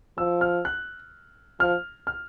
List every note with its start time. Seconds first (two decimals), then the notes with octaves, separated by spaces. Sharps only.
0.18 F3 E6
0.41 F6
0.65 F#6
1.60 F3 F6
2.07 F6